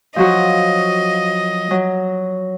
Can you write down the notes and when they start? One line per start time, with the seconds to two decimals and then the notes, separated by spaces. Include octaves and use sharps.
0.16 F3 F#3 F#4 D#5
1.71 F#3